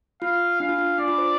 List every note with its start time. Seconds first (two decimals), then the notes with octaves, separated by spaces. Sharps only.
0.21 F4 F5
0.60 D4 F5
0.69 F4
0.79 D4
0.98 D4 D5
1.08 F4
1.18 C5